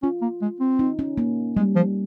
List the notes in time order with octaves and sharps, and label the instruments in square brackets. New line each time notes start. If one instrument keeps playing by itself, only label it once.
[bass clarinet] C#4 [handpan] F4
[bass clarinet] A#3
G#3
C4
[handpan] D#4
C#4
A#3
[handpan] G3 [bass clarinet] G#3
[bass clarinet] F3